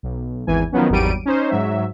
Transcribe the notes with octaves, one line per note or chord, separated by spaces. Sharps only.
B1
G#1 E2 E3 G#5
D#3 F3 F#3 B3 C#4
G#1 E2 F#3 G3 D7 D#7
C#4 D#4 C5
G#2 F#3 E5